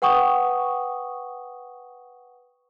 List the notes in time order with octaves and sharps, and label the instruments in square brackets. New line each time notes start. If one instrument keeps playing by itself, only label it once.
[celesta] B4 F#5 G5 C#6 D#6